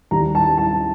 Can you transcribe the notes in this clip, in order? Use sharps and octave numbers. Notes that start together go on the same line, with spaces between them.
D#2 D#3 G3 A#5
A5
A5